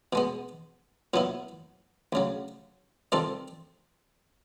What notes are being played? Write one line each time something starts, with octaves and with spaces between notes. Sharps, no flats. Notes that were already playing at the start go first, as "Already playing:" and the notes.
B2 G#3 B3
A#2 F#3 B3 E4
D2 C#3 F#3
D#3 G3 C4 F4 A4